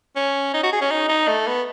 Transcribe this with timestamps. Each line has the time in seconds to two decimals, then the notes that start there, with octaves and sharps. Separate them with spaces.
0.16 C#4
0.54 D#4
0.63 F#4
0.73 G#4
0.81 C#4
0.91 D#4
1.09 D#4
1.28 A3
1.47 B3